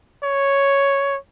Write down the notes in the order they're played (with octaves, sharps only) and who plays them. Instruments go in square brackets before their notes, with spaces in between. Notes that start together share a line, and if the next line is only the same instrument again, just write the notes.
[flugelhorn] C#5